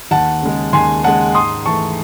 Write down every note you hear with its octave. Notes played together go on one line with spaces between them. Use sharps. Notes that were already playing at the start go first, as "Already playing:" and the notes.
D#2 F#5 A5
C#3 G#3
D#2 G#5 C6
C#3 G#3 F#5 A5
G#2 C6 D#6
E3 A3 A5 C#6